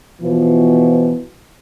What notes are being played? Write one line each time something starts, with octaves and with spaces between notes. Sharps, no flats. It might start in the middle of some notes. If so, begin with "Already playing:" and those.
B2 E3 F3